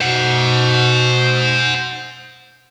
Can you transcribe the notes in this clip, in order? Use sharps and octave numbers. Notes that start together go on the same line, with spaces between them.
B2 C5 F#5